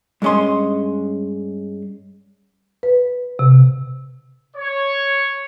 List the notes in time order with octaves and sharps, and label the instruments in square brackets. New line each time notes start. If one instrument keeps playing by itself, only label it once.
[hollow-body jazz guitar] G2 G#3 C#4 D#5 C6
[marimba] B4
C3
[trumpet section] C#5